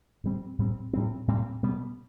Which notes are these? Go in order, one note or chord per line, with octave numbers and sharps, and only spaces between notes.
A2 G3 C4
A2 G3 C4
A2 G3 C4
A2 G3 C4
B2 G3 B3